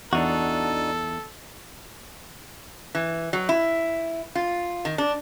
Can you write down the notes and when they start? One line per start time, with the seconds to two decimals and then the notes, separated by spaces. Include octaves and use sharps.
0.13 E2 D4 D#4 F#4 A4
2.95 E3
3.33 F#3
3.49 E4
4.35 F4
4.85 D#3
4.98 D4